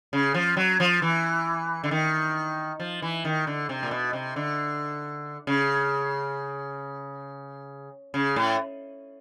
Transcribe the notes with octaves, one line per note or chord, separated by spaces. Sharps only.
C#3
F3
F#3
F3
E3
D3
D#3
F3
E3
D#3
D3
C3
A#2
B2
C3
D3
C#3
C#3
A2